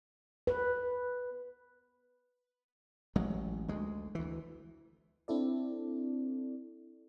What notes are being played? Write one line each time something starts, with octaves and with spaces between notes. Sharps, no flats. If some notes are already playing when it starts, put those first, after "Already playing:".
B4
A1 F#3 G#3
D2 G#3
D2 E3
C4 D4 E4 A4 D5